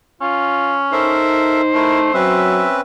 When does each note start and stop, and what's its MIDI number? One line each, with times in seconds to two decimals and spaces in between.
0.21 1.18 61
0.21 0.78 65
0.92 2.10 63
0.92 1.61 69
0.92 1.61 70
0.92 2.52 72
0.92 1.61 76
1.74 2.12 57
1.74 2.00 64
1.74 2.00 70
2.14 2.66 54
2.14 2.81 60
2.14 2.81 61
2.14 2.81 71
2.14 2.78 76